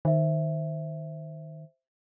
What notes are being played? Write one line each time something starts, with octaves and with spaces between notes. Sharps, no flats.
D#3 C5 E5